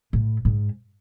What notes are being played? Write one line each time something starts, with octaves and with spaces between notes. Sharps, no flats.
A2
G#2